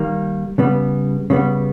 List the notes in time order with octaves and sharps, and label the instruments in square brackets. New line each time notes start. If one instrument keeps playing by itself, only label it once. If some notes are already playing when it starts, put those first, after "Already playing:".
Already playing: [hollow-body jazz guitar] D#3 G3 A#3
C#3 G3 B3
C#3 G3 B3